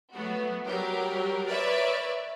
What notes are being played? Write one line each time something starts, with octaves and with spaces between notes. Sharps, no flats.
F#3 A3 B3 F#4
F#3 G3 G4 A#4
A#4 B4 C#5 D5 E5